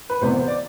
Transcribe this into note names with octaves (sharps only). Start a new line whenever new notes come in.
B4
E1 E2 C3 E3 B3 C5
D5